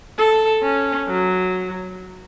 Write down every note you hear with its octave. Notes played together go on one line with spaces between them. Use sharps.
A4
C#4
F#3